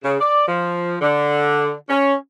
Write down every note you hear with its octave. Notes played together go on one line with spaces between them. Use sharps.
C#3
D5
F3
D3
C#4